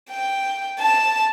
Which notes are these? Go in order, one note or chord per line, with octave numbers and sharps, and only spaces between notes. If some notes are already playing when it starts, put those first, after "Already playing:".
G5
A5